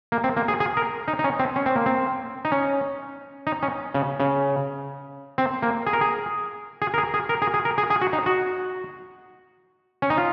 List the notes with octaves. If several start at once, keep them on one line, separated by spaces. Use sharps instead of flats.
A#3
C4
A#3
G#4
G#4
A#4
D#4
D#4
C#4
C4
C#4
C4
A#3
C4
D#4
C#4
D#4
C#4
C#3
C#3
C4
A#3
G#4
A#4
G#4
G#4
A#4
G#4
G#4
A#4
G#4
G#4
A#4
G#4
G#4
F#4
D#4
F#4
C#4
D#4
F4